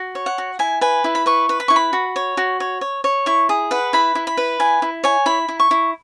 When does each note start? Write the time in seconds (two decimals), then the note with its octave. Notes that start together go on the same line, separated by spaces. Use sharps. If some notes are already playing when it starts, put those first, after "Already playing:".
Already playing: F#4
0.15 C#5
0.26 F#5
0.38 F#4
0.59 E4 G#5
0.81 B4 G#5
1.04 E4
1.15 B5
1.26 B4 C#6
1.49 B4
1.60 B5
1.68 E4 C#6
1.76 B5
1.93 F#4
2.16 C#5
2.37 F#4
2.60 C#5
2.81 C#5
3.04 C#5
3.26 E4 C#6
3.49 G#4
3.71 B4 F#5
3.93 E4 B5
4.15 E4
4.27 B5
4.37 B4
4.60 E4 G#5
4.82 E4
5.04 C#5 G#5
5.26 E4 B5
5.48 E4
5.60 C#6
5.71 E4